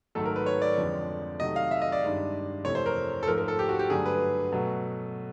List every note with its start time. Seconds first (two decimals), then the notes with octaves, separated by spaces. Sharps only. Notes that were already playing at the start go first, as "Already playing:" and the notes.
0.15 G#2 D#3 F#3 A3 A4
0.26 A#4
0.36 B4
0.46 C#5
0.62 D5
0.78 F2 D3 F3 G#3
1.40 C3 D#3 F#3 A3 D#5
1.56 F5
1.71 E5
1.82 D#5
1.92 D5
2.03 G2 D#3 G#3
2.65 F2 C3 E3 A3 C#5
2.75 C5
2.86 A#4
3.23 A4
3.27 G#2 F3 A3 A#4
3.38 A#4
3.48 A4
3.59 G4
3.69 F#4
3.79 G4
3.90 G2 D3 F#3 A3 G#4
4.06 B4
4.52 B2 F#3 A3